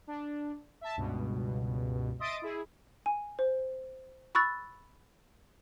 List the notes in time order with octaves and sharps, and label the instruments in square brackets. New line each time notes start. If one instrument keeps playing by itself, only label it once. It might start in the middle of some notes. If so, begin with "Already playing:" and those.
[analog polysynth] D4
E5 A5
C#2 G2 B2
D#5 E5 C6 D#6 A6 D7
E4 G#4
[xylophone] G#5
C5
B5 C#6 E6 F#6 A6